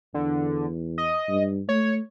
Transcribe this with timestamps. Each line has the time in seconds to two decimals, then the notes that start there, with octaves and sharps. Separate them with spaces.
0.14 E2 D3
0.98 D#5
1.29 G2
1.69 A3 C#5